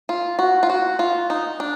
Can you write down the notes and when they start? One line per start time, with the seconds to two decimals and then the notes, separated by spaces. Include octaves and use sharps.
0.09 F4
0.39 F#4
0.63 F4
0.70 F#4
0.99 F4
1.30 D#4
1.60 D4